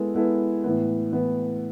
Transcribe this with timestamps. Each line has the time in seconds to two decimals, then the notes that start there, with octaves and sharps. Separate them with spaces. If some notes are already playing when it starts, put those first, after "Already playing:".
Already playing: G#3 B3 E4 A4
0.14 G#3 B3 E4 A4
0.64 A2 E3 B3
1.12 A2 E3 B3